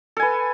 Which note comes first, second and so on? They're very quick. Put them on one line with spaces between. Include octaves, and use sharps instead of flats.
A4 G#5 B4